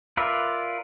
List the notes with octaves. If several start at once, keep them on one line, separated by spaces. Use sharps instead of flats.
F4 A#4 B4 D5 E5